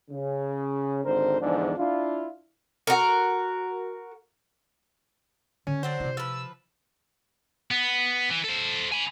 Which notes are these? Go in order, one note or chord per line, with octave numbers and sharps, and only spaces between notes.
C#3
G#1 D3 A#4 C5
E2 G#2 D3 F3 D4
D4 E4 F4
F#4 A#4
D3 C#4
F#3 C4 D4 C5
C3 E4
F3 B4 E6
B3
E3
A4 C5
G#5 B5